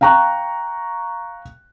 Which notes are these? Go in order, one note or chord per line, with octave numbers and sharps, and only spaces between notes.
F5 G5 A#5 C#6 F#6